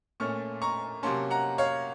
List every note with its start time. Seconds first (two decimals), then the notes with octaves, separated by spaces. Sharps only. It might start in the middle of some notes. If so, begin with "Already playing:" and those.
0.20 A#2 A3 C#4 C#6 F6
0.62 A#5 C#6
1.03 C3 F#3 A#3 C#4 A5 C6
1.30 F#5 A#5
1.58 C#5 F5